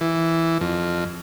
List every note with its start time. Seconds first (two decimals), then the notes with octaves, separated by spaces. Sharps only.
0.01 E3
0.61 F2